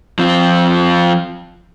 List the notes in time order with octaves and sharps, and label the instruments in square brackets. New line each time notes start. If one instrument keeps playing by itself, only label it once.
[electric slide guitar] F3 C4 F4